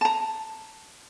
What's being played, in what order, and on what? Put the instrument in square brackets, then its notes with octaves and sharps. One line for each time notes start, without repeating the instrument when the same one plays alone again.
[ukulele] A5 A#5